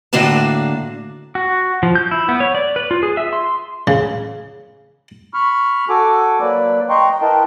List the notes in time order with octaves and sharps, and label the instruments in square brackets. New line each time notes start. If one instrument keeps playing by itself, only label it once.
[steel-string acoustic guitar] A2 D3 A#3 D4 F#4 A5
[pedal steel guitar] F#4
F3
G6
E4
B3
C#5
D5
B4
F4
G#4
E5
C6
[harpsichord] C#3
[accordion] B5 C#6 F6
F#4 A4 G#5 D6
F#3 A#3 B4 D5
D#5 G5 A#5 C6 C#6
E4 A#4 B4 D#5 G5 A5